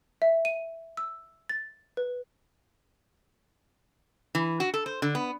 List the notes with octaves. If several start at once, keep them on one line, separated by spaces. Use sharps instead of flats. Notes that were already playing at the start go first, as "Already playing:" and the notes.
E5
D#7
E6
A6
B4
E3
F#4
A4
C5
D3
B3